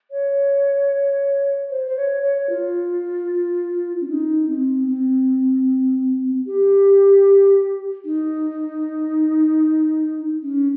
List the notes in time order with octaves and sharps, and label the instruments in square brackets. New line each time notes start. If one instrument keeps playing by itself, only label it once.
[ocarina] C#5
C5
C5
C#5
C#5
F4
C#4
D#4
C4
C4
G4
D#4
C#4